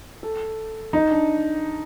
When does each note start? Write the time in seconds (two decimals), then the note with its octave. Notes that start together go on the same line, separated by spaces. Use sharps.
0.23 A4
0.93 D#4
1.11 D4